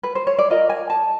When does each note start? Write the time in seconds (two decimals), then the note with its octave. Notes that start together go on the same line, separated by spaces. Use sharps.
0.03 B4
0.15 C5
0.27 C#5
0.39 D5
0.50 F4 A#4 D#5
0.69 G#5
0.90 A5